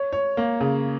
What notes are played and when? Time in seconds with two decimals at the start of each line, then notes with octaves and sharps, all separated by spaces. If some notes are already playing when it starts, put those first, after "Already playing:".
Already playing: C#5
0.13 C#5
0.37 A#3
0.60 C#3